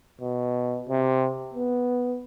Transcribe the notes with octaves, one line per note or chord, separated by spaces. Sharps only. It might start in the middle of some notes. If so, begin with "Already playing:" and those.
B2
C3
B3